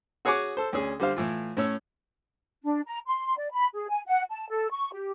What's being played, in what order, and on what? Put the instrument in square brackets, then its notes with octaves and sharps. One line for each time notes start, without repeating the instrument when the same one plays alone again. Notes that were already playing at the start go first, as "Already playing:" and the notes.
[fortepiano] F#4 G#4 C#5 F#5 G#5 D6
A4 C5
D2 C#4 G#4
D3 G3 C5 F5
A2 E3 F4
A2 C#4 C#5 E6
[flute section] D4
A#5
C6
D5
B5
G#4
G#5
F#5
A5
A4
C#6
G4